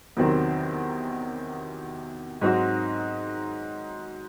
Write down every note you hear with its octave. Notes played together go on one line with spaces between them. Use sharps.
E2 C3 D#3 F#3 C4
G#2 F#3 C4 D#4 F#4